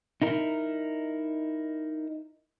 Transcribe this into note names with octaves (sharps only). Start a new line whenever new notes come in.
D#4 E4 A#4